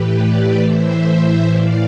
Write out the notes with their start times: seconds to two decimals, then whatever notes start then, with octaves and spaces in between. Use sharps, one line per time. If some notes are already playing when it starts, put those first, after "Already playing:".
Already playing: A2 E3 G4 B4
0.14 B4 D5
0.59 A2 E3 C5 E5
1.49 A2 E3 D5 F5